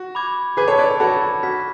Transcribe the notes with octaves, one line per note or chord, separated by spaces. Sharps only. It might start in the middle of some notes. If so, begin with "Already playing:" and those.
Already playing: F#4
B5 D6 G#6
G#4 B4 B5 D6 G#6
A4 C#5
B4 D5
A4 C#5
F#4 A4 B5 D6 G#6
F#4 F6 G#6 B6